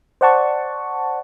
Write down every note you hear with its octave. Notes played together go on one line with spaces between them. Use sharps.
C5 D5 F#5 A5 C#6